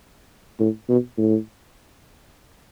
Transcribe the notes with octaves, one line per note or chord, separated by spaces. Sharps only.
A2
B2
A2